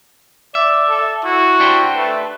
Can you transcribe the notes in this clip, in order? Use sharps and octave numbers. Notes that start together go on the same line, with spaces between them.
D5 E5
A4
E4 F#4
D4 G4 C5
A3 B4